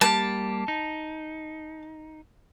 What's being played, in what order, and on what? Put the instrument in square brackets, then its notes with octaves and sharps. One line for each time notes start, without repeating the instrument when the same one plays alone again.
[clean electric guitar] G3 A#3 G4 [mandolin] A5
[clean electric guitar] D#4